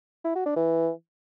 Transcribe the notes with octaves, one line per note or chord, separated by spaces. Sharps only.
E4
F#4
D4
E3